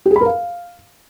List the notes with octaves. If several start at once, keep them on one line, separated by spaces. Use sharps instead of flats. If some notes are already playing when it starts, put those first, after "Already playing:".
G4
G#4
B5
A#4
F5